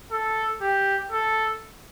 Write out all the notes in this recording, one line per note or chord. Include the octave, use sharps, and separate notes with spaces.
A4
G4
A4